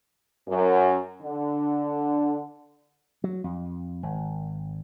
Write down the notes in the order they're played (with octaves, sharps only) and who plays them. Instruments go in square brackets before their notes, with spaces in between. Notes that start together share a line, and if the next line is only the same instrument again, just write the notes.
[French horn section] F#2
D3
[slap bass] F#3
F2
G#1